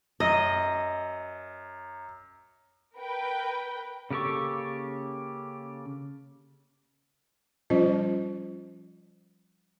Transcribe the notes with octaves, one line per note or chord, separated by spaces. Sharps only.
F#2 D#5
A#4 B4 G5
C#3 A#3 G4 A4 C#6
F3 G3 C#4 F4 C5 D#5